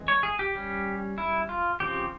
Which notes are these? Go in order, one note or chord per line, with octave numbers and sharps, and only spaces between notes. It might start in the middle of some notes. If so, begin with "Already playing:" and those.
Already playing: E3 G#3 C4
C#5
G#4
G4
G3 C#4
E4
F4
C#3 F3 C4 G4